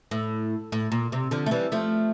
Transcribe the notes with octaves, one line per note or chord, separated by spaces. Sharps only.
A2
A2
A#2
C3
D3 F3
A3
E3 G3
F3 A3